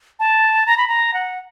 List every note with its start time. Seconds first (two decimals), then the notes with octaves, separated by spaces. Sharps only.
0.20 A5
0.66 A#5
0.77 B5
0.88 A#5
1.14 F#5